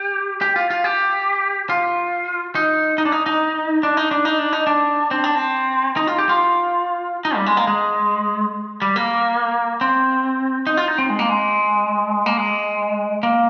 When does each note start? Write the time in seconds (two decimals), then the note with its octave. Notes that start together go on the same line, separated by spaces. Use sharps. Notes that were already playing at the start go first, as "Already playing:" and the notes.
Already playing: G4
0.41 G4
0.56 F4
0.70 F4
0.84 G4
1.70 F4
2.55 D#4
2.98 D#4
3.05 D4
3.12 D#4
3.26 D#4
3.83 D4
3.97 D#4
4.11 D4
4.25 D#4
4.39 D4
4.53 D#4
4.67 D4
5.11 C4
5.24 D4
5.35 C4
5.97 D#4
6.07 F4
6.18 G4
6.29 F4
7.25 D#4
7.36 G3
7.46 G#3
7.57 A#3
7.67 G#3
8.82 G3
8.96 A#3
9.81 C4
10.67 D#4
10.77 F4
10.88 D#4
10.98 C4
11.10 G#3
11.19 A#3
11.29 G#3
12.26 A#3
12.37 G#3
13.23 A#3